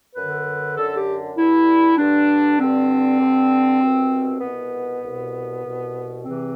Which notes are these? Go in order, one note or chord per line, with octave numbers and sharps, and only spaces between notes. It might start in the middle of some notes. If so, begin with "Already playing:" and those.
F#2 D3 B4
F#2 D3 A4
G4
G2 D3 E4
G2 D3 D4
G2 D3 C4
G2 D3
C2 B2
C2 B2 B3
C2 B2
C2 B2
E2 C3 E3 C4